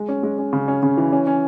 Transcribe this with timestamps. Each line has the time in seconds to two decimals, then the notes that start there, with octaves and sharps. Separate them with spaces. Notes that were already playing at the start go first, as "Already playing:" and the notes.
Already playing: G#3
0.08 C#4
0.23 G#3
0.38 C#4
0.53 C#3
0.68 C#4
0.83 C#3
0.97 E3
1.12 C#4
1.27 C#4